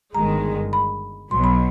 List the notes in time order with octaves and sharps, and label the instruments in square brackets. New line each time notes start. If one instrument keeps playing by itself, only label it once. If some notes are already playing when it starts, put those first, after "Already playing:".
[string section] G1 G2 D#3 G#3 [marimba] A#5
[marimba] B5
[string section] B1 B2 F#3 [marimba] C6
[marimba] B5